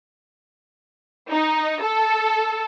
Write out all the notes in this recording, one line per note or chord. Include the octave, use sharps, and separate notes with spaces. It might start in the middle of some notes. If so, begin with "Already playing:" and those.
D#4
A4